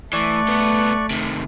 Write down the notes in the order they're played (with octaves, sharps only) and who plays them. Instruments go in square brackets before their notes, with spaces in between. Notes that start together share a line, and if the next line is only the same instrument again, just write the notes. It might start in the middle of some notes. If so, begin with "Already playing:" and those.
[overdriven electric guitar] E3 [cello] A3 [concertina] D5 C#6 F#6
[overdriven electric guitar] C2 B3
C3 D#3